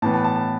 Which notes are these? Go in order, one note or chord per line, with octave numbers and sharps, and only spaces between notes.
A2 E3 B3 A5
A5
A5
A5